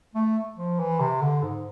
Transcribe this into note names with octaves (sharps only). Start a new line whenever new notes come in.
A3
F3
E3
C3
D3
G#2